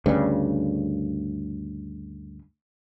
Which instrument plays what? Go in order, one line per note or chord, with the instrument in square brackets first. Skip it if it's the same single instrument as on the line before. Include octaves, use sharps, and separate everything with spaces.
[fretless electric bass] D2 G2 C#3